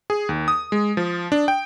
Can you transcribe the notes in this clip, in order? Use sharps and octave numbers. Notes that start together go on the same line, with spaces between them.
G#4
D#2
D#6
G#3
F3
D4
G5